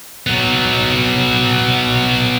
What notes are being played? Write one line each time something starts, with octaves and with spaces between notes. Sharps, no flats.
F#3 B3